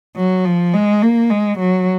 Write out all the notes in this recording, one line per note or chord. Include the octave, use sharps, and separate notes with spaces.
F#3
F3
G#3
A#3
G#3
F#3